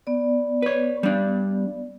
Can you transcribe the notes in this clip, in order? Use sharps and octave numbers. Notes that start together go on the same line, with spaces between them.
B3 D5
B4 C#5
G3 D4